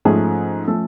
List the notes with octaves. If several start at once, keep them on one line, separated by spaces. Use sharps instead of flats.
G#2 F3 A3 C#4 G#4
F3 A3 C#4 A4